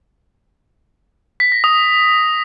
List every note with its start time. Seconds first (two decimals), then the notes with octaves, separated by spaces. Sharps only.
1.40 B6
1.52 A#6
1.64 D#6